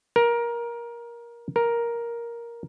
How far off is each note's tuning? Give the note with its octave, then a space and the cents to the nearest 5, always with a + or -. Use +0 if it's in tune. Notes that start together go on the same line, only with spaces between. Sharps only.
A#4 +20
A#4 +10